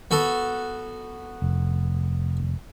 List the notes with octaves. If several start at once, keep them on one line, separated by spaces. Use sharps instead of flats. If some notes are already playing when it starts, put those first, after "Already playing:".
B3 F#4 A4
F1